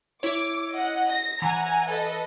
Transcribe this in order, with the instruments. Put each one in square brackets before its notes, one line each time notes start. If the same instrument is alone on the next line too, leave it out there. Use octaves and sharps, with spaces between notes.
[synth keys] E4 C#5 [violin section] D6
[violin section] D#5 F#5
A#6
[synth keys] E3 [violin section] F#5 G#5 A#5
[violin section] A4 B4 D#5